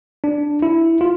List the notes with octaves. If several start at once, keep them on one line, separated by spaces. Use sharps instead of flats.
D4
E4
F4